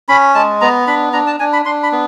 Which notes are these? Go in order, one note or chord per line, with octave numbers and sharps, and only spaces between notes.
C#4 B5
G#3 A5
B3 A#5
D4 B5
D4 A#5
A5
D4 G#5
B5
D4 C6
B5
B3